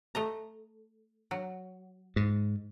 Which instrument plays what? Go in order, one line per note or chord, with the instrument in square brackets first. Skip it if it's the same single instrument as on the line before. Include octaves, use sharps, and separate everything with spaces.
[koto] A3 D#5 A#5
F#3
[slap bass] G#2